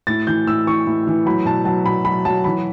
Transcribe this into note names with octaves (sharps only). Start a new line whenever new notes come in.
A2 A6
E3 G6
A2 E6
E3 C#6
A2
E3
F#3 B5
B2 A5
F#3 A5
B2 B5
F#3 B5
F#3 A5
E3 B5